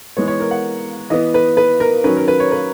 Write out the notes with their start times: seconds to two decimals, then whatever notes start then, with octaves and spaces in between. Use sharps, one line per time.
0.17 E3 G#3 B3 C#5
0.28 C#5
0.40 A#4
0.51 F#5
1.10 E3 B3 D#5
1.34 B4
1.57 B4
1.80 A#4
2.04 D#3 F#3 C#4 B4
2.17 A#4
2.28 B4
2.40 C#5
2.52 B4